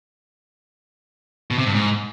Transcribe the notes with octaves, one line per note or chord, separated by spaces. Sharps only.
B2
C3
G2
G#2